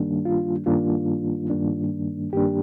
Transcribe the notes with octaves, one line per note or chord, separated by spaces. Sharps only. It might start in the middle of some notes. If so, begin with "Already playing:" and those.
Already playing: G2 D#3 G3 A#3 D4
F4
G2 D#3 G3 A#3 D4 F4
G2 D#3 G3 A#3 D4
G2 D#3 G3 A#3 D4 G4